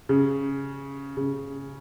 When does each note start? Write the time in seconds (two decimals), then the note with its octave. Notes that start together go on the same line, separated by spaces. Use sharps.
0.09 C#3
1.17 C#3